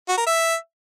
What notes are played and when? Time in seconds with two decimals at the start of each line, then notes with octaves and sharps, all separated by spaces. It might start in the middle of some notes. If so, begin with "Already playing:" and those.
0.08 F#4
0.17 A#4
0.26 E5